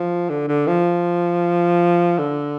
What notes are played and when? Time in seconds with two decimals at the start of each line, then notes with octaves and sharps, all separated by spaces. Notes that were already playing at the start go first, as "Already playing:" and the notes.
Already playing: F3
0.29 D3
0.48 D3
0.67 F3
2.18 D3